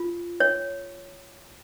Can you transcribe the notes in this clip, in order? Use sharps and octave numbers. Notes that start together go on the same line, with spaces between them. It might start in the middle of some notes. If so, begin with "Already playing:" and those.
Already playing: F4
C#5